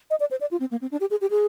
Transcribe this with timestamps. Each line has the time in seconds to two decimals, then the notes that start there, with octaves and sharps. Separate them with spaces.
0.10 D#5
0.20 D5
0.31 C5
0.41 D5
0.51 F4
0.60 C4
0.71 A#3
0.81 C4
0.91 D4
1.00 G4
1.11 G#4
1.21 G4
1.31 G#4